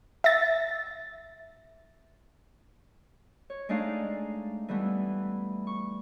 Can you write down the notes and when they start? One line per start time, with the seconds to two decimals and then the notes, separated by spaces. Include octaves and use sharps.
0.24 E5 A6
3.50 C#5
3.69 G#3 A3 D4 D#4 D5 F5
4.69 E3 G3 A3 B3 E4
5.67 C#6